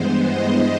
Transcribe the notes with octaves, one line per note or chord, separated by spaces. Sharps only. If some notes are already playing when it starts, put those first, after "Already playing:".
Already playing: G2 E3 G#3 B3 C5
D#5